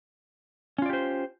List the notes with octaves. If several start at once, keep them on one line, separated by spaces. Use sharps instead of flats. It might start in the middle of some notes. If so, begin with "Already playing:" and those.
C#4 F4 G4 C5 D5